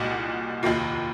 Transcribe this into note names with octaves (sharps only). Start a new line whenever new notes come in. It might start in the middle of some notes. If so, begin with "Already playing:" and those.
Already playing: C2 A#2 G#3 D#4 F#4
F1 D#2 D#3 A#3 F4